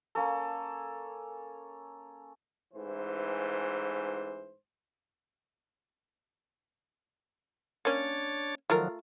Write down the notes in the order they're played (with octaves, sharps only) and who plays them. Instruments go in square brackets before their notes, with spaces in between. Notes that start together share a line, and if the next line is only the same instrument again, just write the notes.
[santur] A#3 C#4 A4
[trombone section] A1 G#2 E3 C5
[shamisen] A#3 C#4 [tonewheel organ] D4 C#5 A6
[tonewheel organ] D#3 F3 F#3 [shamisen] A3 F4 A#4